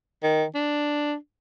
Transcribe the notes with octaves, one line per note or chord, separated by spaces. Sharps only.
D#3
D4